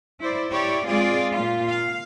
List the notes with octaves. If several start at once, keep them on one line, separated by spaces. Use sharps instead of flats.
E4 C5 D5
E4 G4 C#5 D5
G#3 C4 F4 G#4 D5
A#2 F4
F5